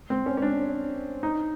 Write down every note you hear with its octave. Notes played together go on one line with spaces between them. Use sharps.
C4
C#4
C#4
D4
D#4